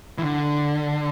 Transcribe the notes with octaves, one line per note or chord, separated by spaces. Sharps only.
E3
D3